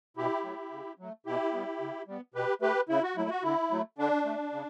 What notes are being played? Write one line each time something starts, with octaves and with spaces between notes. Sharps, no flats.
B2 E4 G4
F#3 A3
C#3
F#3 A3
B2 E4 G4
G3 B3
C#3
G3 B3
B2 G4 B4
A3 G4 B4
C#3 E4
F#4
F#3 A3 E4
F#4
D3 E4
F#3 A3
D3 D4
A3
C#3